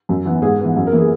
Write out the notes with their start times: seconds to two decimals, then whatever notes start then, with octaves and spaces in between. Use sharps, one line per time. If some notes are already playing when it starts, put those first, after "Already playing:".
0.09 F#2
0.25 E3 B3
0.42 G#2 G#4
0.60 E3 B3
0.76 F#2
0.87 A#4
0.92 E3 A#3
0.98 G#4